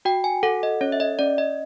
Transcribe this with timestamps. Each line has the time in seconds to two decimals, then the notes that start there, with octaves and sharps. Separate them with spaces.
0.05 F#4 G5
0.24 G#5
0.43 A4 F#5
0.63 D#5
0.81 C#4 C#5
0.92 E5
1.00 D#5
1.19 C#4 D5
1.38 D#5